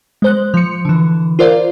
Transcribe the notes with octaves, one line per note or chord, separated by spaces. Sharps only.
G#3 C5 F#6
F3 C#7
D3 E3
F4 A#4 C5 D5 F5